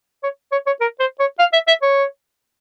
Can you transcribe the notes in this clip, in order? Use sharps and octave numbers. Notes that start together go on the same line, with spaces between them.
C#5
C#5
C#5
A#4
C5
C#5
F5
E5
E5
C#5